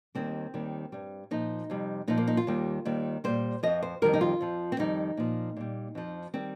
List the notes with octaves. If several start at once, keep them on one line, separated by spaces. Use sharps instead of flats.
D#2 D#3 G3 C4
D#2 D#3 G3
G2 G3
A#2 F3 D#4
F2 C3 G3
A#2 F3 D#4
A#3
D#4
F4
D#2 D#3 G3
D#2 D#3 G3
A#2 G3 C5
F2 F3 D#5
C5
F2 D#3 G3 A#4
D#4
F4
F2 F3
C4
F2 D#3 G3 D#4
A#2 F3
A#2 G3
F2 F3
D#3 G3 C4